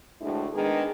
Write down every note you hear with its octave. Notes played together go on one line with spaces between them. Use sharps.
D2 A2 G#3 D4 E4
D#3 G#3 B3 D4 G#4